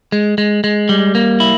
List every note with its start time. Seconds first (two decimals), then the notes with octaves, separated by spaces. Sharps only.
0.12 G#3
0.38 G#3
0.64 G#3
0.89 G3
1.15 A#3
1.40 E4